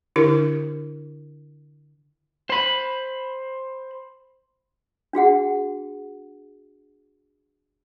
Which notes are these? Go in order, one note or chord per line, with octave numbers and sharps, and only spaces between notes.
D3 D4 E4 G4 A#4
C5 B5
D4 F#4 G#4 F#5